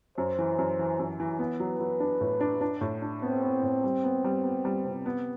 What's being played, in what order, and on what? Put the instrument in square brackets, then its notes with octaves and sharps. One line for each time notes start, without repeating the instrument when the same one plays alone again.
[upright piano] F#2 [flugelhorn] C5
[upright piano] E3
F#2
E3
F#2
E3
B3
F#3
[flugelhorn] B4
[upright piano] F#3
D4
A2
D4
D4
A2
D4
[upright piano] B3 [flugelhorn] C4
[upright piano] B3
A2
G3
B3
G3
B3
G3
C3
B3